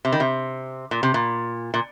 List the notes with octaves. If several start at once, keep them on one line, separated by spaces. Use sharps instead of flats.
C3
D#3
C3
A#2
C3
A#2
A#2